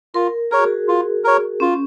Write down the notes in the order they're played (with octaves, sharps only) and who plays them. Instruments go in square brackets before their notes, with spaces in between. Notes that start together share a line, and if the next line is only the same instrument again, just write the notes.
[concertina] F4 [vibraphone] A#4
[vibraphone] G#4 [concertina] A#4 C#5
[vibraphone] F#4
G#4
[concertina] F4
A#4 C#5
[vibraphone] C#4 [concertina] F4